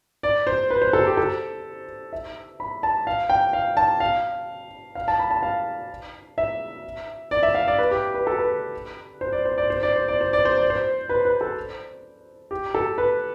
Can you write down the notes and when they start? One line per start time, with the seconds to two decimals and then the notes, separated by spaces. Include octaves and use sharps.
0.23 D5
0.47 C5
0.70 B4
0.82 C5
0.93 A4
1.06 G4
1.17 A4
2.13 E5
2.60 B5
2.83 A5
3.07 F5
3.30 G5
3.53 F5
3.77 A5
4.00 F5
4.95 F5
5.08 A5
5.19 B5
5.31 A5
5.43 F5
6.38 E5
7.31 D5
7.43 E5
7.55 F5
7.68 D5
7.78 B4
7.91 G4
8.15 B4
8.27 A4
8.39 B4
9.21 C5
9.33 D5
9.45 C5
9.58 D5
9.70 C5
9.83 D5
9.96 C5
10.08 D5
10.21 C5
10.33 D5
10.45 C5
10.57 D5
10.70 C5
11.09 B4
11.25 B4
11.41 A4
12.51 G4
12.75 A4
12.98 B4